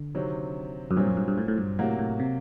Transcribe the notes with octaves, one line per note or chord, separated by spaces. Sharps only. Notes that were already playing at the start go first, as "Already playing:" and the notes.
Already playing: D3
C3 D#3 F#3 C4
F#2
G2 A#2 F#3 C4
F#2
G2
G2
A2
A2
G2
A2 C3 F#3 A#3 F#4
A2
C3